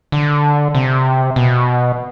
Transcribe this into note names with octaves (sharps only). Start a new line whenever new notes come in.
D3
C3
B2